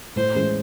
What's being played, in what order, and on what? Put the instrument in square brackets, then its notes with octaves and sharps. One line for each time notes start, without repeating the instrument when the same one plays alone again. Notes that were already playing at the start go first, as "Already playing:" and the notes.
[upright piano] A2 [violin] C5
[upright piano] E3 G#3 C#4